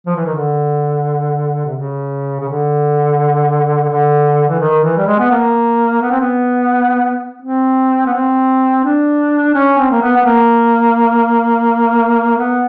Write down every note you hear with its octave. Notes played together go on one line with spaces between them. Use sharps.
F3
E3
D#3
D3
C3
C#3
C#3
D3
D3
E3
D#3
E3
G3
G#3
B3
A#3
B3
C4
B3
C4
B3
C4
D4
C#4
C4
A#3
B3
B3
A#3
B3